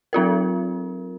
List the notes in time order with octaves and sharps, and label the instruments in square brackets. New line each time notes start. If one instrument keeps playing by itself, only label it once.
[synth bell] F#3 C4 F4 A#4